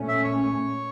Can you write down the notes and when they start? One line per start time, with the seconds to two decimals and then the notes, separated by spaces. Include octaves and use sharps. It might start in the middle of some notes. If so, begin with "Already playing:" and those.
Already playing: A#2 A3 C#4
0.08 E5
0.24 C#5